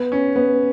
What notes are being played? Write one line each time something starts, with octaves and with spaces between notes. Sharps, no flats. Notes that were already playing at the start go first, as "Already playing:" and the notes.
Already playing: B3
C#4
B3